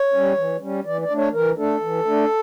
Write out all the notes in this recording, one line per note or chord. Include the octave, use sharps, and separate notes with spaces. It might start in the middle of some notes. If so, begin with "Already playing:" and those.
Already playing: C#5
G3 C#4
E3
G3 C#4
E3 D5
D5
A3 D4
C#5
E3 A#4
A3 D4 A4
E3
A3 D4